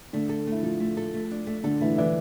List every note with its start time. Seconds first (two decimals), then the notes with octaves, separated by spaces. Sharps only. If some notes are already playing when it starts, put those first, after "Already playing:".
0.13 D3 A3 D4
0.29 A4
0.47 A3 E4
0.63 F3 F4 A4
0.80 A3
0.97 A4
1.14 A3
1.31 D4
1.47 A3
1.64 D3 D4 A4
1.81 E3 A3 E4
1.97 E3 D4 E4